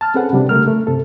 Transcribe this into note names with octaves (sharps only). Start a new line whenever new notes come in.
A5 F6
C4 C#4 G#4 A4 B4 F#5
C3 G3 D4
C#3 A3 A#4 F6
A3
G2 C3 A4